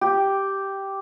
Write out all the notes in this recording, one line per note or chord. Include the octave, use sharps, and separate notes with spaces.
G4